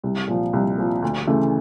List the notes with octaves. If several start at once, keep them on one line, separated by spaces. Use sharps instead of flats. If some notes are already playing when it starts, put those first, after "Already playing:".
C2
A#2 F3
C2
A#2 F3
D2
C#3 E3 A3